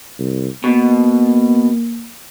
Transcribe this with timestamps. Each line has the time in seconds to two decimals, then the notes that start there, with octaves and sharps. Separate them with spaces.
0.19 C2
0.64 B2 A#3